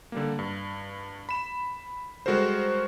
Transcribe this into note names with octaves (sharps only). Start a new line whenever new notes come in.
D3 G3 A#3
G2
B5 E7
G3 G#3 F#4 A4 A#4 C5